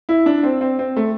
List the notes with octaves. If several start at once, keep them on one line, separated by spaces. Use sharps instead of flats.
E4
D4
C4
C4
C4
A3